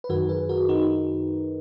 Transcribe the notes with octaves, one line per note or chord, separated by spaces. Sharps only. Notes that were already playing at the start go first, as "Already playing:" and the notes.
B4
F#2 D#3 F#4 A#4
G#4 B4
F#4 A#4
D#4 F#4